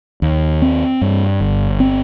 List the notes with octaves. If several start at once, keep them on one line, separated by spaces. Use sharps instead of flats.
D#2
C4
G2
G1
C4